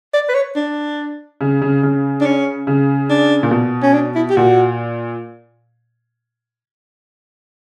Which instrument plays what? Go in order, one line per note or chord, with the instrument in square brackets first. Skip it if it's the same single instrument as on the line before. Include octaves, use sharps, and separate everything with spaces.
[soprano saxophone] D5
B4
C#5
D4
[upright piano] C#3
C#3
C#3
[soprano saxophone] D4
C#4
[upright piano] C#3
[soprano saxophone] D4
[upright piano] A#2
B2
[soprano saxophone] C#4
D4
E4
G4
[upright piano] A#2 [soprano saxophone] F#4